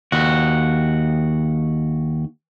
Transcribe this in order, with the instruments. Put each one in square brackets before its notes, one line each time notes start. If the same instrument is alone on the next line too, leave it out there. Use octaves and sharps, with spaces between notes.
[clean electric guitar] D#2 F#4